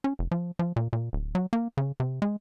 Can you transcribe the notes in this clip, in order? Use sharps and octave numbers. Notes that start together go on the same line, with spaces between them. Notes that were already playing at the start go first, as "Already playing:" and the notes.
C#4
F1
F3
F3
A#2
A#2
D1
F#3
A#3
C#3
C3
G#3